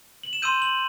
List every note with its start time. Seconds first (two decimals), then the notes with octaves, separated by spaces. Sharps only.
0.23 F#7
0.33 E7
0.42 C6 E6 G6 D#7
0.62 F#7